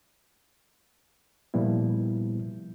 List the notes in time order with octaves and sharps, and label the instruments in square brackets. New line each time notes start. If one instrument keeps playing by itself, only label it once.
[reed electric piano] A#2 F3 G3 B3 E4